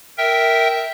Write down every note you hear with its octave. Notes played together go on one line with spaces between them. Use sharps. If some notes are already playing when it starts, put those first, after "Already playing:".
A#4 E5 G5